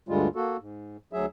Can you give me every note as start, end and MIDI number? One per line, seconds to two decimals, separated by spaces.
0.09 0.28 38
0.09 0.28 43
0.09 0.28 50
0.09 0.28 55
0.09 0.28 56
0.09 0.28 65
0.36 0.57 58
0.36 0.57 66
0.36 0.57 69
0.60 0.97 44
1.13 1.26 38
1.13 1.26 54
1.13 1.26 68
1.13 1.26 76